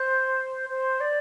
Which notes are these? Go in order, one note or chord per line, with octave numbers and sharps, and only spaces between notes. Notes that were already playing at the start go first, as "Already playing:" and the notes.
Already playing: C5 G6
C5
D5